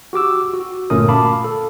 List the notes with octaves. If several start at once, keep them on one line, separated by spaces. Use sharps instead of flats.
F#4 G4 D6 E6
F#4
G1 A#2 A3 C#4 A#4 D#6
F5 A5 B5 D6
A4